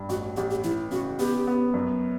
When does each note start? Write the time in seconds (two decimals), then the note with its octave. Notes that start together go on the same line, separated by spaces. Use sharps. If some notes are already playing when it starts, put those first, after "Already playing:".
Already playing: G2
0.09 A1 F#4
0.36 A1 G4
0.50 G4
0.64 E3 E4
0.91 C#3 F#4
1.19 B3 G4
1.47 B3
1.74 F#2